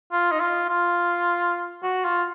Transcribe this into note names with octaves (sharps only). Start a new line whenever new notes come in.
F4
D#4
F4
F4
F#4
F4